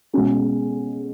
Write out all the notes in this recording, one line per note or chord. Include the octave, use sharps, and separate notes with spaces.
B2 G#3 C#4 F#4